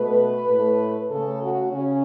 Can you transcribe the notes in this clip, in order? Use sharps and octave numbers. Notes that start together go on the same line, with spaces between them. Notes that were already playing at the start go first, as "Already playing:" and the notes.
Already playing: B2 A3 B4
A2 A3
C#3 A3 A4
F#4
C#3 C#4